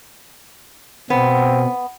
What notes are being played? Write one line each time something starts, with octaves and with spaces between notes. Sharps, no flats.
B2 B3 C4